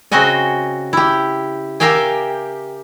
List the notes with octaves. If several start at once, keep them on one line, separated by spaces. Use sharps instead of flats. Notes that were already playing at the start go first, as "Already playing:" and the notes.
C#3 C4 F#4 D#5 F#5 G#5
E4 G4
G4 A#4 E5 F5 G5 G#5